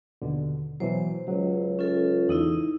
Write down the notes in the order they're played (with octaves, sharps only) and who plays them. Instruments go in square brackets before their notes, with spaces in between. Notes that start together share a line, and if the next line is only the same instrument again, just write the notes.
[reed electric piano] D#2 B2 D3
[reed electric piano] B2 E3 F#3 [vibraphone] C5
[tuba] C#2 [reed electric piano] F#3
[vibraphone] C#4 F4 A4
[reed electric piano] E2 D#6 [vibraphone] D#4 E4